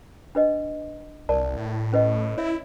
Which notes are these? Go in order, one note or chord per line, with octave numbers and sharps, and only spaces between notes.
D4 B4 D#5
C2 A#4 D5 A5
A2
C#4 B4 D#5
E4 C#5 E5